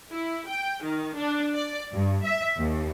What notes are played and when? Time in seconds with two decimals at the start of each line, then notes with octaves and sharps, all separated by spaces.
0.11 E4
0.49 G5
0.84 D#3
1.17 D4
1.55 D5
1.93 G2
2.25 E5
2.58 D#2